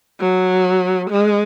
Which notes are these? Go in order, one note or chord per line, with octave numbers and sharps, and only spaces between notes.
F#3
G#3